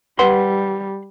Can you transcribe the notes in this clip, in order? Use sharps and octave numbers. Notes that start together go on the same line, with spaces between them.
G3 B4 F#5 C6